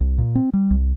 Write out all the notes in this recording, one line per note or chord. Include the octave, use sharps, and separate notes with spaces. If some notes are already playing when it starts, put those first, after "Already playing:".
C2
A#2
C4
G3
C2